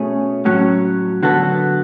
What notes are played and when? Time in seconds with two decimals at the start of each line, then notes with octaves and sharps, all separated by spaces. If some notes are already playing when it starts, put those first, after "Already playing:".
Already playing: B2 A3 C#4 G#4
0.45 A2 F#3 C#4
1.23 D3 F#3 B3 F#4 A4